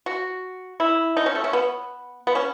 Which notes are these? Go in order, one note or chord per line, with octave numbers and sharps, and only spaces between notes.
F#4
E4
D#4
C#4
A3
C#4
B3
B3
C#4